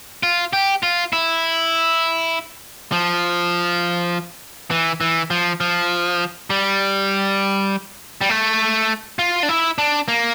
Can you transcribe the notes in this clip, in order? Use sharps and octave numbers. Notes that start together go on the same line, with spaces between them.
F4
G4
F4
E4
F3
E3
E3
F3
F3
G3
G3
A3
F4
D4
E4
D4
A#3